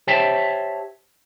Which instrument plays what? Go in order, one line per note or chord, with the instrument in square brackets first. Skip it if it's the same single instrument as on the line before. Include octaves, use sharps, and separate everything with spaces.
[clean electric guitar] G4 C5 C#5 E5 G5 A5